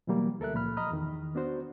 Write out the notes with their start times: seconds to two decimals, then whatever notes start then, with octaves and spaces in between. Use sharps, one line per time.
0.07 B2 E3 F#3 G3 A#3
0.40 D2 A4 A#4 E5 F#6
0.53 C#2 A#2 F3 B5 F6
0.77 D#5 A#5 B5 D#6 F6
0.91 E2 D#3
1.35 B3 D4 F#4 C5